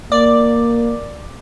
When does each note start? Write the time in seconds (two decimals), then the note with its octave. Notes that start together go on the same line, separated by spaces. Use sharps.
0.12 A#3 D5